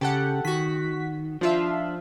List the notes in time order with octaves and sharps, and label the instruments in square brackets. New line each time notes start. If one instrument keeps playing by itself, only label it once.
[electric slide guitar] C#3 [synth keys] G4 A4 F#5
[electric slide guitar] D#3 [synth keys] F#4 B6
[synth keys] F3 F4 E5 [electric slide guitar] D4